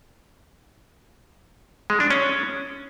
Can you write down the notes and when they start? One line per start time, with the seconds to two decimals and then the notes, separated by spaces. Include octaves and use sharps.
1.90 G#3
2.00 D4
2.10 C#4